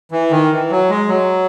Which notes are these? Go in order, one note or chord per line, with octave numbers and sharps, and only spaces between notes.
E3
D#3
E3
F#3
G#3
F#3